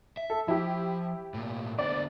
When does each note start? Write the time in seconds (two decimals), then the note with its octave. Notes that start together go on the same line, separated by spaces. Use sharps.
0.17 E5
0.30 A4
0.48 F3 E4 G4
1.34 A2 A#3
1.79 D3 B3 C5 D5